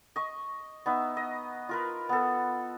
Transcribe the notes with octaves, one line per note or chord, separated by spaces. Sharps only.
D#5 C#6
B3 D#4 E5
D#5
F4 A#4 B4
B3 A4